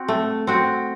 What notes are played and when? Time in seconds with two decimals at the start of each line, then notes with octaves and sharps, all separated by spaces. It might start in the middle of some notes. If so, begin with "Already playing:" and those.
Already playing: C4 F#4
0.08 A3
0.47 C4 F#4